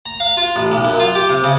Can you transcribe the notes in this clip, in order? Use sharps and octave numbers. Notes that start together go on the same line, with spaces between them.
A#5
F5
F4
A1
B1
F#2
F4
G4
C3
C#3